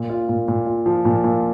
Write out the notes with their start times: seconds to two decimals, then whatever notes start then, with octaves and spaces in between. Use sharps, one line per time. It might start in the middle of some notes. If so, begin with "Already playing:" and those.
Already playing: A#2
0.10 F4
0.29 A#2
0.48 A#2
0.66 F4
0.86 F3
1.05 A#2
1.24 A#2